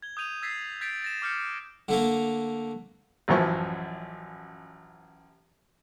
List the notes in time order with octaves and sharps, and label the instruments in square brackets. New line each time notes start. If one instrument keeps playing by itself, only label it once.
[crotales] G#6 G7
D#6 G6 D#7 F7
E6 G#6 A6 B6 C7
G6 A6 B6 C7 D7
A6 A#6 E7
D6 F6 G6 C#7
[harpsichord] D3 A3 A#3
[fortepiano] A1 F#2 E3 F3 C#6